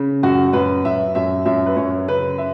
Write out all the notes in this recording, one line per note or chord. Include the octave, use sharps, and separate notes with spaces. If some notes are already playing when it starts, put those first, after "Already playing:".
Already playing: C#3
F#2 F#4
F#2 B4
F#2 E5
F#2 E5
F#2 E5
B4
F#2 C#5
C#3 B4
E5